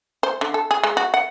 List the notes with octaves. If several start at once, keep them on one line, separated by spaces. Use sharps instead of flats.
C5
D3
A4
G#4
G#3
F#4
F#5